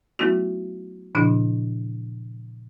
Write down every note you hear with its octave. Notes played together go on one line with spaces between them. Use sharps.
F#3 A3 B3 D#4 E4 F#4
A#2 C#3 F3 D4 E4